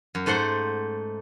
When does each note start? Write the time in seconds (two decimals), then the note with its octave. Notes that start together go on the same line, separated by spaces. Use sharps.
0.15 F#2
0.26 G#2 A3 C5 F#5 C6